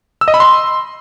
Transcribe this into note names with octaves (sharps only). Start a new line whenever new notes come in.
E6
D#5
B5
C6